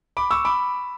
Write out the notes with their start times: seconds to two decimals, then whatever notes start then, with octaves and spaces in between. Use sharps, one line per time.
0.17 B5 D6
0.31 C#6 E6
0.45 B5 D6